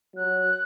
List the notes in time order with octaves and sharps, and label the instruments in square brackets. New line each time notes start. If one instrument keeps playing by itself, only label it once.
[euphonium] F#3 [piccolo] F#6